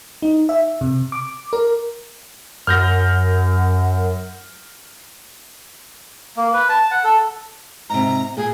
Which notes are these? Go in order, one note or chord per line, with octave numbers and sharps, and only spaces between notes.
D#4
E5
C3
D6
A#4
F#2 F6 G6 A#6
A#3
B4
A5
F#5
A4
G#2 C3 A#5
A#2 G#4